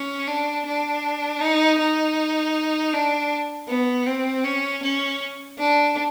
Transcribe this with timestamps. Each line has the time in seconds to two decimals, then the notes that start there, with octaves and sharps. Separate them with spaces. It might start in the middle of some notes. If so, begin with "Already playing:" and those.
Already playing: C#4
0.27 D4
0.66 D4
1.40 D#4
1.79 D#4
2.93 D4
3.68 B3
4.06 C4
4.44 C#4
4.83 C#4
5.58 D4